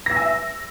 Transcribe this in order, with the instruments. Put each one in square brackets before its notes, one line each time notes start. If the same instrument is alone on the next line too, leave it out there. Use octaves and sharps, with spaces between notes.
[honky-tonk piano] A#6
E6
G#5
E5
E6